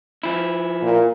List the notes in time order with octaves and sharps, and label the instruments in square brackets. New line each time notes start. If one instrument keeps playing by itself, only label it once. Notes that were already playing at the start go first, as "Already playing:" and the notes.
[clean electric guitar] F3 E4
[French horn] A#2